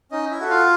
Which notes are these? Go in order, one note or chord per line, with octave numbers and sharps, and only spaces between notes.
C#4 D#4 D#5
E4 E5
F#4 A4
F4 F5